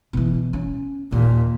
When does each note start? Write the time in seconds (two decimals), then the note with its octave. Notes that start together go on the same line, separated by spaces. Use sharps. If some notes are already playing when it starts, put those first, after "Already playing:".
0.13 B2 E3
0.53 C#4
1.12 D#2 A#2